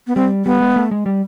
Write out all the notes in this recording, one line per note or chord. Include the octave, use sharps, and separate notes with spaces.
B3
G3 C4
G3 B3
G#3
A3
G#3
G3